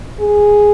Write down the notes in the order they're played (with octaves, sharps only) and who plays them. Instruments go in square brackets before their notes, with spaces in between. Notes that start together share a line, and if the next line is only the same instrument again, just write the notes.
[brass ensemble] G#4